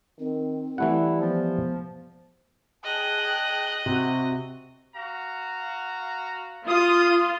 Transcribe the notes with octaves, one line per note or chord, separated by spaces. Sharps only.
D#3 C4
E3 G3 A3 E4 F#5
F3 B3
G#4 D#5 G5 A5 F#6
C3 F#4
F#4 F5 A#5
F4 D#6